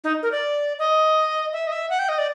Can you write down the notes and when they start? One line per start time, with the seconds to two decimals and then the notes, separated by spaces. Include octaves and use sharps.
0.04 D#4
0.23 A#4
0.32 D5
0.79 D#5
1.53 E5
1.67 D#5
1.72 E5
1.90 F#5
1.99 G5
2.09 D#5
2.18 D5